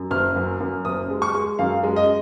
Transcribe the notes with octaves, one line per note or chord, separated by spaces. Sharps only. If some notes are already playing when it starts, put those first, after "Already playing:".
Already playing: F#2
F#1 F6
F#2
F#2
F#1 D#6
G#3
C#6
G#3
F#2 F5
G#3
D#5